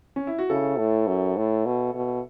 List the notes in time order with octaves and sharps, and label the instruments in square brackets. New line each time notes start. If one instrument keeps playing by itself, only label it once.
[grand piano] C#4
E4
F#4
[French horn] C#3 [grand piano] E4 A4
[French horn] A2
F#2
A2
B2
B2